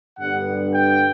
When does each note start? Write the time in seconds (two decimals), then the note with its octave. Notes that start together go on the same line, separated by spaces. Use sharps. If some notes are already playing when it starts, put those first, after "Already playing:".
0.19 G2 D3 G3 B3 D4 F#5
0.73 G5